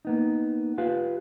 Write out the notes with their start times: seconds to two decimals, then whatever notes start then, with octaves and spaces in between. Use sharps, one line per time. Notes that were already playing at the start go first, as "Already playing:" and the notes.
0.05 A#3 B3 D#4
0.78 F4 G4 B4 F5